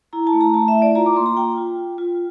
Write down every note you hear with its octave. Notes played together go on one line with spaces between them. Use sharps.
E4 A#5
A5
A3
A#5
A3 A5
E5
E4
D5
F4 A#5
D6
A#3 C6
A#5
F4 G5
F4
F4
F4